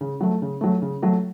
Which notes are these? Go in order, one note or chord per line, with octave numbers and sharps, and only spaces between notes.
C#3
F#3 A3
C#3
F#3 A3
C#3
F#3 A3